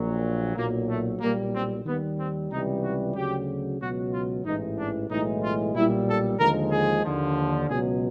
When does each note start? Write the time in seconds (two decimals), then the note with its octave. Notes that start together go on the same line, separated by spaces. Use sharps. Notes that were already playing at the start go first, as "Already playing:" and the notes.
Already playing: A#1 A#2 F#3
0.56 B1 A#2 F#3 A#3
0.88 A3
1.21 B1 A#2 G3 A#3
1.54 C4
1.85 D#2 D#3 G3 B3
2.19 C4
2.51 C#2 C3 E3 G3 D#4
2.84 F#4
3.15 D2 C#3 F#3 G4
3.80 C#2 B2 F#3 F#4
4.13 F4
4.45 A1 G#2 E3 D#4
4.77 D4
5.10 B1 A2 E3 G#3 D#4
5.42 F4
5.74 B1 A#2 G3 E4
6.07 A4
6.39 D#2 D3 F3 G#3 A#4
6.71 G#4
7.04 D#2 D3 F3
7.69 C#2 B2 F#3 G#4